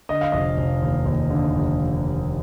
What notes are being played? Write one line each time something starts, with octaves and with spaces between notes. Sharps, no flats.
D3 D#5
F5
F1 D#5
F1
D#2
D#2
D3
F1